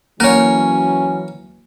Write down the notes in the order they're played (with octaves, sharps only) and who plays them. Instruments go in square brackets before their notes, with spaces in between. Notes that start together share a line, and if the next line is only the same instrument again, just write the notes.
[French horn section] E3 F#3 [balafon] A#3 F#5 [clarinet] C#4 [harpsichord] A#4 C#5